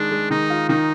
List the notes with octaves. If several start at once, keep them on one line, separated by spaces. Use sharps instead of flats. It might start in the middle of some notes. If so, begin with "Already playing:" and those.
Already playing: D#3 G#3 D4
G#3
D#3 D#4
F4
D#3 D#4